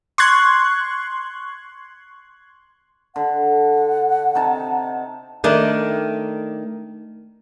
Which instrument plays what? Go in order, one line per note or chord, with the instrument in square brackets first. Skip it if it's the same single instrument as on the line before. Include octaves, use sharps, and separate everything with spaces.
[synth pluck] C6 C#6 F#6 G#6
[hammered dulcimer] D3 [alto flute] F#5
[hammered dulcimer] C3 D#4 A5
[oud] D#3 A3 D4